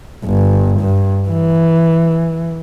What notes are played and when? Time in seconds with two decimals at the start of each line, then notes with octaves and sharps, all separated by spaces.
0.24 G1
0.80 G2
1.28 E3